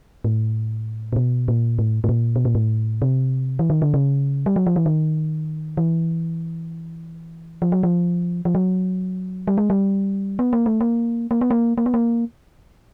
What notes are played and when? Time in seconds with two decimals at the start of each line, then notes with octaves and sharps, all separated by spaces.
0.25 A2
1.13 A#2
1.16 B2
1.48 A#2
1.79 A2
2.04 A2
2.09 A#2
2.36 B2
2.45 A#2
2.55 A2
3.02 C3
3.59 E3
3.70 D#3
3.82 D3
3.94 C#3
4.46 G3
4.56 F#3
4.67 F3
4.76 E3
4.86 D#3
5.77 E3
7.62 F3
7.72 F#3
7.83 F3
8.45 F3
8.55 F#3
9.48 G3
9.58 G#3
9.70 G3
10.39 B3
10.53 A#3
10.66 A3
10.81 A#3
11.31 A#3
11.41 B3
11.51 A#3
11.78 A#3
11.86 B3
11.94 A#3